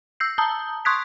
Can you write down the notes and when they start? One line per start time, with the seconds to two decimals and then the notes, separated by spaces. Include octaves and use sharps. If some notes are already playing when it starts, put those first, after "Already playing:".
0.20 E6 G6 C7
0.38 A5 A#5 D#6 G6
0.85 C6 C#6 D#6 F#6 G#6 B6